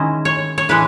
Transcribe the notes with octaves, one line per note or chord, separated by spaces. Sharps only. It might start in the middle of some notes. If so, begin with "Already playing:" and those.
Already playing: D#3 G#3 C#4 E4 D#5
C#5
C#5
A2 E3 G#3 B4